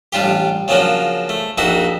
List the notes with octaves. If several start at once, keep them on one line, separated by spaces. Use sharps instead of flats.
A1 G3 D4 F4 G4
C#3 F3 F#3 A#3 C#4 D4
A3
A#1 F2 A#3 D#4 F#4 E5